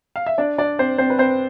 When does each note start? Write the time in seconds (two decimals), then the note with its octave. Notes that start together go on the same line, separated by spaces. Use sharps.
0.16 F5
0.26 E5
0.38 D4 D5
0.58 D4 D5
0.79 C4 C5
0.98 C4 C5
1.10 B4
1.18 C4 C5